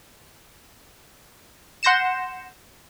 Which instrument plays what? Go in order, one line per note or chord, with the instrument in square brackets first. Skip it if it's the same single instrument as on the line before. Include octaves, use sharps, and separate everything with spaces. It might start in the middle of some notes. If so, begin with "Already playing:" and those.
[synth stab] F#5 C6 G6 A#6 C#7 E7